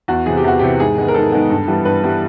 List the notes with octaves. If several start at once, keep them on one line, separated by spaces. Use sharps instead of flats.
E2 F#4
C3 E3 G#4
G4
E2 F#4
C3 E3 G4
G#2 G#4
D#3 G#3 B3
A#4
G#2 A4
D#3 G#3 B3
G2
E3 G3 B3
G2 B4
E3 G3 B3